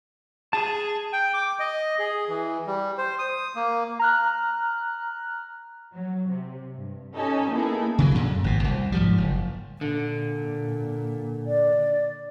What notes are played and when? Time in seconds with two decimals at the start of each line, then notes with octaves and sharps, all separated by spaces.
0.53 G#4 A5
1.13 G5
1.34 D6
1.59 D#5
1.99 G#4
2.29 E3
2.67 G3
2.98 C5
3.19 D#6
3.56 A#3
3.99 A#5 F6 F#6
5.95 F#3
6.29 C3
6.74 G2
7.15 C#4 D#4 G4 A4 D#5 G#5
7.49 A#3 B3 D#4 E4 G#4 A4
7.99 C#3 E3 F#3
8.15 F#2 A#2 D3
8.44 G#1 B2
8.64 C2
8.92 G#2 F3 G3
9.18 F#1
9.81 A#2 D3
11.46 D5